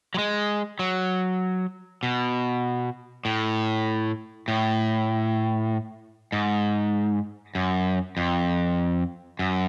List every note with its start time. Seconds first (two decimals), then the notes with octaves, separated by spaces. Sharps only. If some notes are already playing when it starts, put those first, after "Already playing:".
0.14 F#3
0.18 G#3
0.79 F#3
2.03 B2
3.25 A2
4.48 A2
6.32 G#2
7.55 F#2
8.17 F2
9.39 F#2